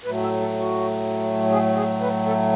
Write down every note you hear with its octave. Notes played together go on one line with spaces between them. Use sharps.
A2 F#3 A3 B4
E5
A4
F#4
G#4
G#4
B4
A4